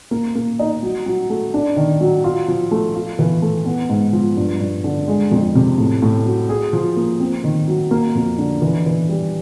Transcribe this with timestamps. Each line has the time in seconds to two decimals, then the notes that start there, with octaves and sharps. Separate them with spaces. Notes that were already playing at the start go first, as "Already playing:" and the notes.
0.11 A#3
0.35 A#3
0.59 D#4
0.83 F#3
1.06 F#3
1.30 A3
1.54 D4
1.77 D#3
2.01 F#3
2.24 F4
2.48 F3
2.71 A3
2.95 F4
3.19 E3
3.42 A3
3.66 B3
3.90 G#2
4.13 F3
4.37 G2
4.60 G2
4.84 D3
5.08 G#3
5.31 F2
5.55 C3
5.78 A2
6.02 A2
6.26 F#3
6.49 G#4
6.73 F3
6.96 A#3
7.20 C4
7.44 D#3
7.68 F#3
7.91 A#3
8.15 F2
8.38 D3
8.62 E3
8.86 E3
9.09 G3